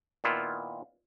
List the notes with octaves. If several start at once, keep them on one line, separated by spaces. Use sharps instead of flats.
A#2 D#3 B3 E4 F4